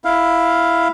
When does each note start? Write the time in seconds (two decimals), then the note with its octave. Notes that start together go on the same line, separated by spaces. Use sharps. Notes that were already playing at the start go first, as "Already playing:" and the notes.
0.04 E4 F5